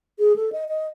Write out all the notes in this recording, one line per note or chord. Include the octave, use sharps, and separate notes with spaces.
G#4
A4
D#5
D#5